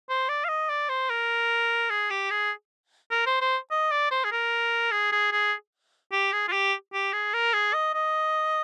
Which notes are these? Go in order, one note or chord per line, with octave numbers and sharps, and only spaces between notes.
C5
D5
F5
D#5
D5
C5
A#4
G#4
G4
G#4
A#4
C5
C5
D#5
D5
C5
G#4
A#4
G#4
G#4
G#4
G4
G#4
F4
G4
G4
G#4
A#4
G#4
D#5
D#5